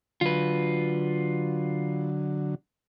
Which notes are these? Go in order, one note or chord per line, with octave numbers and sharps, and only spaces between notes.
D3 F#3 F4 B4